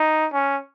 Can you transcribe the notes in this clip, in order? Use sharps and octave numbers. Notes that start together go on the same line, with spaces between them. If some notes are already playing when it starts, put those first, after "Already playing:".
Already playing: D#4
C#4